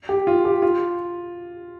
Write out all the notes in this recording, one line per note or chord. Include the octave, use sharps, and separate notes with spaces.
G4
F4
G4
F4